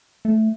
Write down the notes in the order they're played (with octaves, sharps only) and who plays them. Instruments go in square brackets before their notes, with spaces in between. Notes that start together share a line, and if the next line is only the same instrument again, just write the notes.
[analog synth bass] A3